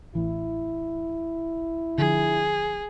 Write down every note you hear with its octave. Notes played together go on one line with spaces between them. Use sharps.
A1 E3 E4
D3 F3 G#4